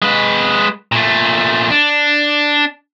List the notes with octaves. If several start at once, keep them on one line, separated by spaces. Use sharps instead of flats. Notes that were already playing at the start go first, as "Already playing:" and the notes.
G#3 B4
A#2 A3
D4